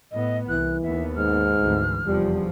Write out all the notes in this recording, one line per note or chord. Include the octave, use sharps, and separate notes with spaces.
A2 B3 D#5
C2 E3 F#6
D#2 B3 E5
G#2 F6
G#1 D2 E3
F1 E2 F3 G3